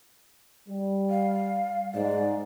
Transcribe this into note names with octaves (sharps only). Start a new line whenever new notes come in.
G3
F5
G#2 D5